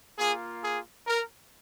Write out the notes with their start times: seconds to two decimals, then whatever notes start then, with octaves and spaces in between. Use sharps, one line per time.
0.18 A#3 F4 G#4
0.63 G#4
1.07 A#4